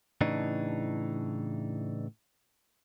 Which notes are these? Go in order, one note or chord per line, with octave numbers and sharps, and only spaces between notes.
A2 C#3 E3 D4 D#4